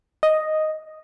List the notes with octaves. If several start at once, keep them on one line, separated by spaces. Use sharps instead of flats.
D#5